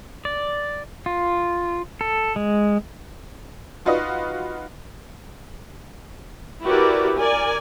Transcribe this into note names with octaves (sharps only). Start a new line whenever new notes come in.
D5
F4
A4
G#3
D#4 F4 F#4 B4 D#5
E4 F#4 G4 A#4 B4 D5
A#4 D5 G#5